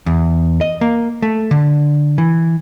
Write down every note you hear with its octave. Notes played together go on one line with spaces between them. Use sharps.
E2
D#5
A#3
A3
D3
E3